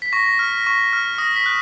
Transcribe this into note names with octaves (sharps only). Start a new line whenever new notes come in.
B6
C#6 A#6
A#6
F6
C#6
F6
D#6 A#6
B6
F#6